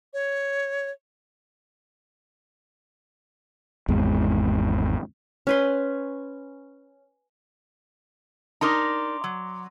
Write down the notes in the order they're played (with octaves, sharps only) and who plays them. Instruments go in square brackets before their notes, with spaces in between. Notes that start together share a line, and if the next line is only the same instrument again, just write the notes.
[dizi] C#5
[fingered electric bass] G#1 E2 G#3
[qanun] C#4 B4 C6
[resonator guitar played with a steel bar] D4 D#4 A#4 [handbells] A#5 C6 D6
[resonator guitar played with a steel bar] F#3